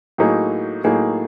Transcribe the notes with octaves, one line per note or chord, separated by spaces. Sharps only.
A2 F#3 A#3 D#4 G#4
A2 F#3 A#3 D#4 G#4